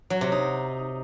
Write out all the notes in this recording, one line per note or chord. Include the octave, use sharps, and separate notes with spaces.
F#3
C3
D#4